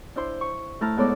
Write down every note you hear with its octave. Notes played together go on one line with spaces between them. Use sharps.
D4 E4 C5 C6
C#6
A3 E4 A5 A#5 F6
G#2 B3 A4 C#5 D5